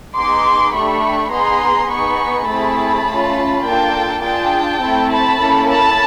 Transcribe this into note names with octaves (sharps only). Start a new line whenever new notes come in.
B3 D#4 G#4 C6 D6
A3 D4 G4 B5 C#6
B3 D#4 G#4 A#5 C6
B3 D#4 G#4 B5 C#6
A3 C4 E4 G#4 A5 B5
A3 C#4 F4
A#3 D4 F4 A4 G5 A5
D4 F4 G#4 G5 A5
A3 C4 E4 A4
A5 B5
A#3 C#4 E4 A4
A5 B5